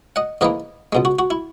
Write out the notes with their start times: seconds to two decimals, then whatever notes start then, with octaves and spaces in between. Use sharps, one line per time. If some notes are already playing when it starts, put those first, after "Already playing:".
0.16 D#5 F#5
0.41 G#2 E3 A#3 B4 D#5
0.92 C#2 B2 G#3
1.05 F#4
1.19 F#4
1.30 E4